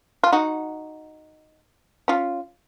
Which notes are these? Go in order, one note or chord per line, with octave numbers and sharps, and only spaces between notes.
F4
D#4 F#4
C#4 F4